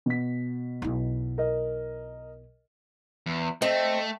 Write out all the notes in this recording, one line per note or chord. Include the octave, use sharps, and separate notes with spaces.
B2 B6
B1 E4
A#4 D#5
E2
A3 C4 D#5